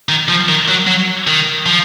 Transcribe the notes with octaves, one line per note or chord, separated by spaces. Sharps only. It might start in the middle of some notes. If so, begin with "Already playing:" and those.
D#3
F3
D#3
F#3
F#3
D#3
F3